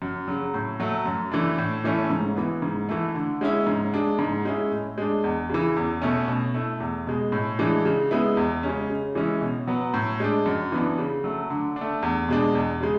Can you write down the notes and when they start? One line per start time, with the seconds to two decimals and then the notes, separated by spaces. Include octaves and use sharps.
0.02 F#2
0.28 C#3 F#3
0.54 A2
0.80 F#3 A3
1.05 F#2
1.32 E3 A3 D4
1.58 A2
1.84 E3 A3 C#4 E4
2.10 G#2
2.37 E3 B3
2.62 G#2
2.89 E3 A3
3.15 D3
3.41 G#3 C#4 E4
3.67 G#2
3.94 G#3 D4
4.19 G#2
4.45 G#3 C#4 E4
4.71 A2
4.98 G#3 D4
5.24 E2
5.50 C#3 E3
5.76 E2
6.02 B2 A3 C#4
6.28 B2
6.54 A3 E4
6.80 E2
7.07 B2 G#3
7.32 A2
7.59 E3 G#3 D4
7.85 C#3
8.11 G#3 B3 E4
8.37 E2
8.63 C#3 G#3 C#4
8.89 C#3
9.15 E3 G#3 C#4 E4
9.41 B2
9.67 F#3 B3
9.94 A2
10.20 G#3 D4
10.46 F#2
10.72 E3 B3 D4
10.98 C#3
11.24 F#3 A3
11.50 D3
11.76 D4
11.81 A3
12.02 E2
12.29 B2 G#3 D4
12.55 E2
12.81 C#3 G#3